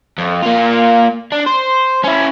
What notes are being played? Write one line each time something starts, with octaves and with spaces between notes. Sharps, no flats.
F2
A#3 F4
D4
C5
C#4 E4